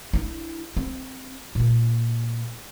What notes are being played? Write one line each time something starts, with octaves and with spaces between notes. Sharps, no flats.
D4 E4
C4
A#2 A#3